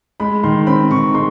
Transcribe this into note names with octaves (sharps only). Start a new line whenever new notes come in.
G#3 B5
D#3 C6
C4 B5
D#3 C#6
G#3 C6